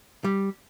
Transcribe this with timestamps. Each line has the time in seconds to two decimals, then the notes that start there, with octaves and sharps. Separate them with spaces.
0.24 G3